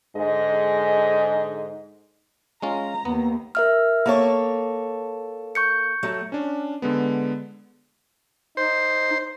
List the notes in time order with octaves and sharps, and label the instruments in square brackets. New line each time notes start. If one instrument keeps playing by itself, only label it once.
[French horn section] G#2 D3 G#3 G#4 D#5
[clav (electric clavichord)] G#3 C#4 F4 [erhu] A#5
[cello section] D#2 [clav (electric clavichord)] B3
[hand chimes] A#4 E5 F6
[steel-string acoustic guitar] A#3 A4 C#5 [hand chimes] B5
[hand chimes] C#6 G6 C#7
[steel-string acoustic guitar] F#3 A3
[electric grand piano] C#4 D4
D3 G#3 B3
[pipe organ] D#4 [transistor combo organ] C5